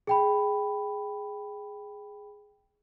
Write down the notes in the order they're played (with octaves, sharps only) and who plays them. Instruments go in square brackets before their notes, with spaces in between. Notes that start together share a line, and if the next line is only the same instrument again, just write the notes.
[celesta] G#4 G5 B5